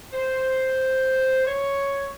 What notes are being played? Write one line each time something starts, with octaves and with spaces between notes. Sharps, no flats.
C5
C#5